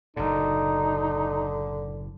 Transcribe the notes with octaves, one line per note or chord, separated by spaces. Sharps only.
F#1 A2 D3 D#4